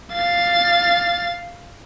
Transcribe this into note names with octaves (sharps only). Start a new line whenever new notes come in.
F5 A6